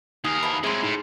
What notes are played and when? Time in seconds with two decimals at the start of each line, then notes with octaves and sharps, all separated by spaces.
0.24 D#2 D#4 G#4 A#4 D#6 C7
0.43 B2 E3 F3 B5
0.64 C3 F#3 G#3 E4 G#4 C6
0.83 A2 D#4